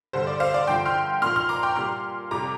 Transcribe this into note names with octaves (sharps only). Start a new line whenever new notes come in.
G2 D3 G3 C5
D5
C5 F5
D5
G2 D3 F3 G5 C6
C6 F6
A#2 F3 C6 F6
C6 F6
A#5 D6
G5 C6
A#2 G3 C6 F6
F2 C3 G3 A#5 D6